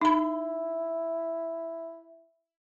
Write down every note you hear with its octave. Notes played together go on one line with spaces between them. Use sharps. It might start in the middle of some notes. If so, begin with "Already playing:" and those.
D#4 E4 B5